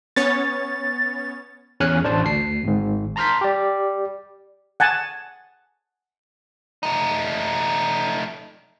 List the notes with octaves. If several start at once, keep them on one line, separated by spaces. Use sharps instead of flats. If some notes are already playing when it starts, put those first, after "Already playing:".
B3 C#4 C#5 A6
E2 C#4 G#5 F6 F#6
A1 D4 C5 A5
D2 C7
G#1 G#2
A5 A#5 C6 F6 G6 B6
G4 D5
F#5 G#5 A5
A3 D#4